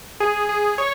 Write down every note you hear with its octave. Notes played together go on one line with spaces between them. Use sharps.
G#4
G#4
C#5